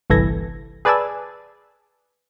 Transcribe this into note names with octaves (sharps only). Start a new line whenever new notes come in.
G1 C2 E3 A4 G#6 A#6
G#4 B4 D5 G#5 A5 E6